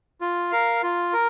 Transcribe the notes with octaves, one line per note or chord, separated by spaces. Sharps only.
F4
A#4 F5
F4
A#4